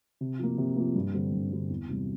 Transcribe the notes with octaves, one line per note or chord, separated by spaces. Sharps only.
C3
F3 A#3
C3
F3 A#3
G2
D3 G3 C4
G2
D3 G3 C4
E2
C3 E3 G3